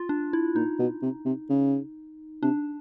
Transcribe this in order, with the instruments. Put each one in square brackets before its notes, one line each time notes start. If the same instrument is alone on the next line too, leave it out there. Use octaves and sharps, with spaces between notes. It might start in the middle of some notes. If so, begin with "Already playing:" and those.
Already playing: [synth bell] F4
D4
E4
[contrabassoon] A#2 [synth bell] D#4
[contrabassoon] B2
C3
C3
C#3
[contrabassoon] C3 [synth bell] D4